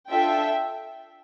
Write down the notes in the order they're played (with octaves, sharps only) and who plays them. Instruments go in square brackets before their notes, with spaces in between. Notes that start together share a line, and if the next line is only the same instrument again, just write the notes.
[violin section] D4 F4 A4 E5 G5